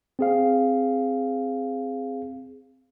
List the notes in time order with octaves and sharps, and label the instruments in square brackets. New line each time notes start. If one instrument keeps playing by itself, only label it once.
[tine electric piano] C4 G#4 F5